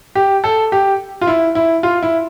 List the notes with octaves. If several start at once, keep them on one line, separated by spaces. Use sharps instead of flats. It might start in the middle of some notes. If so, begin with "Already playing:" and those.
G4
A4
G4
F4
E4
E4
F4
E4